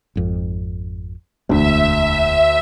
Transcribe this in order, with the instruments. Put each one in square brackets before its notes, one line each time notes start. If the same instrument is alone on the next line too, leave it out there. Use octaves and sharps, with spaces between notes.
[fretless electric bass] G#1 F2
[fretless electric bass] E1 D4 [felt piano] D2 [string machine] E5